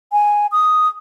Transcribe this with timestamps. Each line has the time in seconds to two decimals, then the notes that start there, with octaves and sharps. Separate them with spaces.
0.12 G#5
0.52 D#6